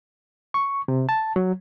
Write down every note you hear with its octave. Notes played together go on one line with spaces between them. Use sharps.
C#6
C3
A5
F#3